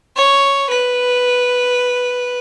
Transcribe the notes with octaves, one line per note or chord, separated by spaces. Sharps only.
C#5
B4